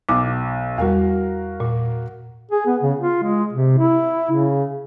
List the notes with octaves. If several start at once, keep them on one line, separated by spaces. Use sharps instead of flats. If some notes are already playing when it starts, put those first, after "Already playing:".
B1 D6
E2 G3 F#4 A#4 F5
A#2
G#4
B3
C#3
F4
G#3
C3
E4
C#3